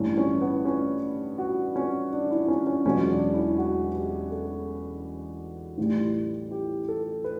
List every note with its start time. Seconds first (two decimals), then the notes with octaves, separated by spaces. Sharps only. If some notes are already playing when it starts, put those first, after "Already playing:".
Already playing: A1 G2 E3 C#4
0.17 C#4
0.41 B3
0.65 C#4
1.38 F#4
1.76 C#4
2.13 D4
2.31 E4
2.48 C#4
2.67 C#4
2.85 E1 E2 B2 F#3 C#4
3.10 D4
3.34 E4
3.58 F#4
3.95 G4
4.31 A4
5.78 A1 A2 E3 G3
6.51 G4
6.88 A4
7.24 B4